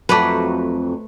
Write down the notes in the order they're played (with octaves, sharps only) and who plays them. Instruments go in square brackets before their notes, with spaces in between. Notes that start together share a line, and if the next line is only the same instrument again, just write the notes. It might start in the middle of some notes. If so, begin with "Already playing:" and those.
[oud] F2 F#3 D5 [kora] A3 B4